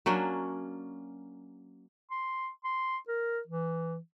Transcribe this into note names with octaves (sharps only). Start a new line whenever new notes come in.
F#3 A#3 C#4 D4
C6
C6
A#4
E3